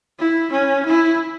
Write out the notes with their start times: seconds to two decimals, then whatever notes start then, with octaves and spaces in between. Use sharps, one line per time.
0.19 E4
0.52 C#4
0.86 E4